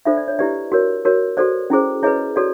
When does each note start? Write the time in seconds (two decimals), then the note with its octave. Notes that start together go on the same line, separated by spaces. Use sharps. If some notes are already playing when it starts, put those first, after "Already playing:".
0.05 D4 F4 A4 C5 D5 E5
0.17 D5
0.28 C#5
0.39 E4 G4 B4 D5
0.72 F#4 A#4 C#5
1.05 F#4 A#4 C#5
1.37 F#4 A4 C5 D5
1.70 C#4 E4 G#4 C5
2.03 E4 G#4 B4 C#5 D#5
2.36 F#4 A4 C#5 D5